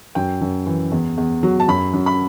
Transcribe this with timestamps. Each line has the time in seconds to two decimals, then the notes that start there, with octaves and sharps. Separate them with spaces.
0.15 F#2 G5
0.41 F#2
0.66 E3
0.92 E2
1.17 E2
1.43 F#3
1.60 A5
1.68 F#2 B5
1.93 F#2
2.06 B5